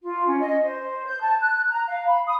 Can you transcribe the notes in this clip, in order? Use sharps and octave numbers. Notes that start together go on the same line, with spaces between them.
F4
C#4
D#5
C5
G6
A5
F#6
A#5
F5
B5
D#6